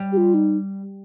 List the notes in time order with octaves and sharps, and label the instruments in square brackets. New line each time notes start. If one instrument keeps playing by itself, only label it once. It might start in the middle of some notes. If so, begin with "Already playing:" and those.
Already playing: [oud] G3
[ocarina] G4
F4
D#4